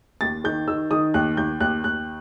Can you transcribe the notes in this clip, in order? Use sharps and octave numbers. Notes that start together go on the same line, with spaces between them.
D#2 A6
D#3 G6
D#3 E6
D#3 D#6
D#2 F#6
D#2 G6
D#2 F#6
D#2 F#6